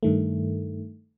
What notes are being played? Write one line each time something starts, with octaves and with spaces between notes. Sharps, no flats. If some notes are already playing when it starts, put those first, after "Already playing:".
G2 D#3 A3